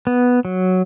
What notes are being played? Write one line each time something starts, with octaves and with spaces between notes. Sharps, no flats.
B3
F#3